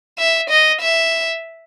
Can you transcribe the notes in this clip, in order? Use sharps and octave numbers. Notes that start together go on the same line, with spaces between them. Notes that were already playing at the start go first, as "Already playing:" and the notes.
E5
D#5
E5